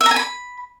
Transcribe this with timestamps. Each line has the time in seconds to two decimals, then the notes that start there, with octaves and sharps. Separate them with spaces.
0.01 E5
0.06 A#5
0.11 G#5
0.16 B5